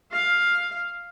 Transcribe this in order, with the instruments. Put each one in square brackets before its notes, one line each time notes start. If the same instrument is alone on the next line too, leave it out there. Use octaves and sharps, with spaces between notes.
[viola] F5